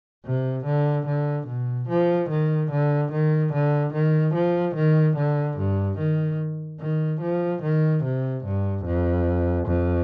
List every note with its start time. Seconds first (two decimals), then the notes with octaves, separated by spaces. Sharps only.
0.25 C3
0.65 D3
1.06 D3
1.48 B2
1.88 F3
2.30 D#3
2.71 D3
3.12 D#3
3.53 D3
3.93 D#3
4.35 F3
4.76 D#3
5.17 D3
5.58 G2
5.98 D#3
6.80 D#3
7.21 F3
7.63 D#3
8.03 C3
8.45 G2
8.85 F2
9.67 F2